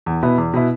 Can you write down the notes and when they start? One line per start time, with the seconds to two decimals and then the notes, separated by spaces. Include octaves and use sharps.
0.06 E2
0.23 B2 B3 E4
0.38 E2
0.54 B2 B3 E4